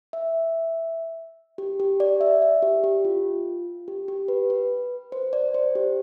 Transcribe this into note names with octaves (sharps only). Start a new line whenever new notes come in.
E5
G4
G4
D5
E5
E5
G4
G4
F4
G4
G4
B4
B4
C5
D5
C5
G4